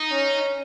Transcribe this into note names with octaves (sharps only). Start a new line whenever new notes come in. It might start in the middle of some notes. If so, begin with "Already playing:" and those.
Already playing: D#4
C#4